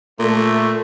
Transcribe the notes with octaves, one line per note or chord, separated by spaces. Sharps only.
A#2 A3